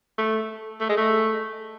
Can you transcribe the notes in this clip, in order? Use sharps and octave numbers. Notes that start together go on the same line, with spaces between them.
A3
A3
G#3
A3